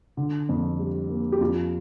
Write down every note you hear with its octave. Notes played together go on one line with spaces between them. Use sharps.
D3
F2
G3
A#3
G4
F2 F4